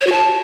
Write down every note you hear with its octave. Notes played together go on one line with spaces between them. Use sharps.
C#5
F#4
A5